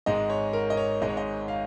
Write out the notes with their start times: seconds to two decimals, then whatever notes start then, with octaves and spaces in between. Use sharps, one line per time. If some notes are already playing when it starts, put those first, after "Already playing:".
0.06 G#1 G#2 G#3 D#5
0.30 C#5
0.53 A#4
0.70 D#5
0.77 C#5
1.01 G#1 G#2 G#3 D#5
1.09 C#5
1.17 D#5
1.48 F5